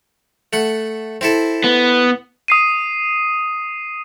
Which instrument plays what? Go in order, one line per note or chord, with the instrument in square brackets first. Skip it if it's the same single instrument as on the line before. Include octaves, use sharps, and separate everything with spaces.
[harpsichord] A3 F#5
C4 E4 A4
[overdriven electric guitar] B3
[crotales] D#6 C7 D#7